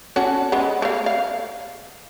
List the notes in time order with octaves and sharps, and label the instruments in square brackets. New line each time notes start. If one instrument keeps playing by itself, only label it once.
[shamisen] C#4 F#4 A4
G#3 B3
A3 F5
F5